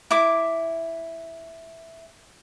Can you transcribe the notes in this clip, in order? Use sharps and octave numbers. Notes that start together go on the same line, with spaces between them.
E4 D6